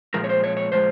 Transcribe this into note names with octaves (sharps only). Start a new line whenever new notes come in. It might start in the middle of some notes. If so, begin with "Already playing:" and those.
A#2 F3 G#3 A#4
C#5
C5
C#5
C#5
A#2 F3 G#3 C5